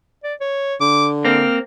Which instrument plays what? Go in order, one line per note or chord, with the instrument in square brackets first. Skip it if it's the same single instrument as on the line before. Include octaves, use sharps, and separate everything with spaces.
[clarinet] D5
C#5
[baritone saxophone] D3 [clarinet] D6
[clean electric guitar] A#3 C4 [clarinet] F6